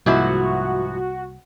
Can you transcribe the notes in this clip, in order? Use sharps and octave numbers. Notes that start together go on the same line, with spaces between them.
C2 G#2 F3 A#3 E4 F#4